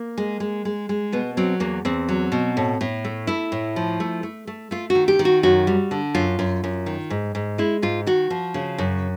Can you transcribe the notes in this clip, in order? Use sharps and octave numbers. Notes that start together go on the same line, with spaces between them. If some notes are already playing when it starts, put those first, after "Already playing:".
Already playing: A#3
G#3
G#3
G#3
G#3
B2 B3
F#3 C4
E2 A#3
E2 C4
F#3
B2
A2
A2
A3
A3 E4
A2
F3
A3
A3
A3
A3 F4
F#4
D#3
G4
D#3
F#4
F#2 F#4
G3
D3
F#2 F4
F#2
F#2
D#3
G#2
G#2
G#3 E4
G#2 F4
D#3 F#4
F3
C#3
F#2